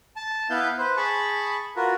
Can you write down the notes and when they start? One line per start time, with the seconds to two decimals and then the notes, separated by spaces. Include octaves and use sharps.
0.16 A5
0.50 B3 E4 B4 F5 G6
0.78 B4 C5
0.97 G#4 A5 B5 C#6
1.76 F4 F#4 A#4 B4